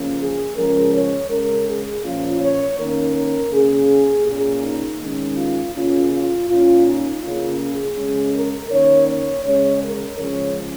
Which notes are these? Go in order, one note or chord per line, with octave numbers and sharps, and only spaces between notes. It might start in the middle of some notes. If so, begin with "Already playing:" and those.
Already playing: C#3 F3 A#3 C#4
G#4
C#3 F3 G#3 C#4 A#4
C#5
C#3 G#3 C#4 A#4
G#4
A#2 F3 A#3 C#4 F4
C#5
D#3 A#3 C#4 A#4
A#4
C#3 A#3 C#4 G#4
A#2 A#3 C#4 G#4
D#4
D#3 G#3 C#4
F4
C#3 A#3 C#4 F4
F4
A#2 A#3 C#4 F4
D#4
C#3 A#3 C#4 F4
G#4
C#3 G#3 C#4
A#4
D#3 A#3 C#4 C#5
C#5
C#3 G#3 C#4 C#5
A#4
C#3 F3 G#3 C#4 C#5